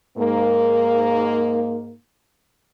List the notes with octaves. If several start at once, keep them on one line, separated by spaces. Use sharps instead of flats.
G#2 A#3